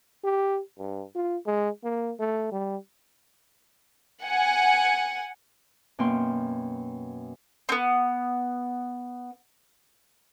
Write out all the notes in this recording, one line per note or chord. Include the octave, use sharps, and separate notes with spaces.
G4
G2
F4
G#3
A#3
A3
G3
F#5 G#5
F#2 B2 A#3 G5 C6
B3 C4